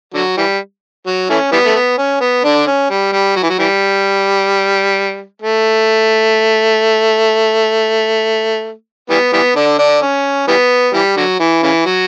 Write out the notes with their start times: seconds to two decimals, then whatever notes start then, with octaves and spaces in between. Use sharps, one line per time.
0.14 D3 F#3
0.37 E3 G3
1.06 F#3
1.30 E3 A3 C#4
1.52 E3 G3 B3
1.65 A3
1.75 B3
1.98 C#4
2.21 B3
2.44 D3 D4
2.67 C#4
2.90 G3
3.13 G3
3.36 F#3
3.43 E3
3.50 F#3
3.59 E3 G3
5.42 A3
9.10 E3 G3 B3
9.33 E3 G3 B3
9.56 D3 D4
9.79 D3 D4
10.02 C#4
10.48 E3 G3 B3
10.94 E3 G3
11.17 D3 F#3
11.40 E3
11.63 C#3 E3
11.85 F#3